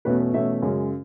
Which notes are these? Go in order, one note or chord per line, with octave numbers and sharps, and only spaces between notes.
E2 B2 A3 C#4 B4
E2 B2 A3 C#4 E5
F#2 C#3 G#3